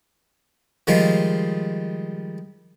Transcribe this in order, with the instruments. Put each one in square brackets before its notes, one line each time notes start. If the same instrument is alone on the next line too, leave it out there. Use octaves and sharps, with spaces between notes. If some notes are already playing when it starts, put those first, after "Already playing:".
[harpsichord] D#3 F3 G3 G#3 F4